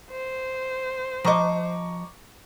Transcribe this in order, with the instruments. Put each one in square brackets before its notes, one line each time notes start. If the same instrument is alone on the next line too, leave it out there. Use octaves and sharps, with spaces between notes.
[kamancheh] C5
[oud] F3 D#5 [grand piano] A#5 C#6 D6